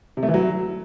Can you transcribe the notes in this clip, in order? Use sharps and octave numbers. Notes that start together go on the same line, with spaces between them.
C3
A3
E3
F#3